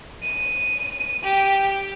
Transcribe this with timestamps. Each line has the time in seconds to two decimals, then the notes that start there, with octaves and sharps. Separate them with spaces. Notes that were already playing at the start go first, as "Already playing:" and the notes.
0.23 D#7
1.24 G4